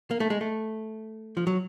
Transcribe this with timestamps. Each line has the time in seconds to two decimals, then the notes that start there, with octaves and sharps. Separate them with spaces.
0.11 A#3
0.20 A3
0.30 G#3
0.41 A3
1.37 F3
1.47 F#3